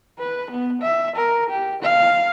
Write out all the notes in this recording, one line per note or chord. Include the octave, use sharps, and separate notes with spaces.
B4
B3
E5
A#4
G4
F5